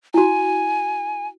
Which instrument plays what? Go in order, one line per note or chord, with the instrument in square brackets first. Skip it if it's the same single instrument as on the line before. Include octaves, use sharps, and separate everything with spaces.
[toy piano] E4 F#4 [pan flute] G#5